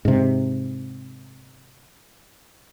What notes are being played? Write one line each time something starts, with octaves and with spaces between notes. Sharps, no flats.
G#2 C3